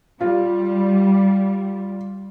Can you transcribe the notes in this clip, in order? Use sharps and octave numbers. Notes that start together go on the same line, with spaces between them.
G3 F4